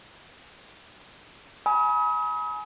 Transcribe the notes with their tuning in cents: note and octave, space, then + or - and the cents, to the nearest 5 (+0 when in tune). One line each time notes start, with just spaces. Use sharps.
G#5 +20 B5 -30 D#6 +40